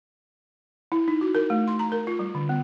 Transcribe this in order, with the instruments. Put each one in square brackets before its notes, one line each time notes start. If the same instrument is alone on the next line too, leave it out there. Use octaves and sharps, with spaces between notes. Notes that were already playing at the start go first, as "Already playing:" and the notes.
[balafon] E4
D#4
F#4
A#4
A3
C6
A#5
A#4
F4
G3
D3
B3